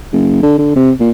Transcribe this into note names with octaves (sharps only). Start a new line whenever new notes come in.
F#1
D3
D3
C3
A#2